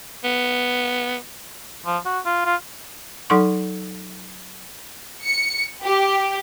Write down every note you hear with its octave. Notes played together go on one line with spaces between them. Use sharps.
B3
F3
F#4
F4
F4
F#3 D#4 A4 F#5 C6 C#6
C#7
G4